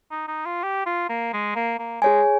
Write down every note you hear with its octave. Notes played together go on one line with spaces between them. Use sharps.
D#4
D#4
F4
G4
F4
A#3
G#3
A#3
A#3
G#3 G#4 C#5 G#5